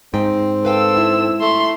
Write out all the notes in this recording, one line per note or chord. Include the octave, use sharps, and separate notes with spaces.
G#2 C4 G5
A4 B4 F5 G5 E6
E4
A3 C6